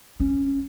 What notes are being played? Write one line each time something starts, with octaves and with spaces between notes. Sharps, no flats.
C#4